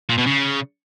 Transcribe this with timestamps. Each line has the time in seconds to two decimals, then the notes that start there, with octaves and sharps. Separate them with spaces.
0.09 A#2
0.18 B2
0.26 C#3